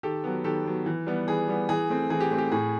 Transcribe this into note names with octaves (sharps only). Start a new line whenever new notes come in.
D#3 G4 A4
F#3 B3
D#3 G4 A4
F#3 B3
E3
G3 B3
E3 G#4
G3 B3
E3 G#4
A3 C4
E3 G#4
G4
A3 C4
G4
A2 G#4